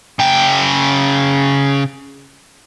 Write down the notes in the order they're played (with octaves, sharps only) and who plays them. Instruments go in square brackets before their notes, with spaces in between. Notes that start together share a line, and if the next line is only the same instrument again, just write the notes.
[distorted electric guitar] C#3 G5